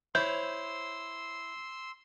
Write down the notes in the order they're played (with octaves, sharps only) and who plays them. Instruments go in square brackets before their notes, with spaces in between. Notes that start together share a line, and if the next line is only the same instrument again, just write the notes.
[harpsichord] E4 [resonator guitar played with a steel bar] C5 C#5 [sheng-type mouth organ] C6 E6 [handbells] G6